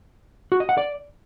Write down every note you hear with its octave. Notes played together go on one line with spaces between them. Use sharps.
F#4
D#5
F#5
D5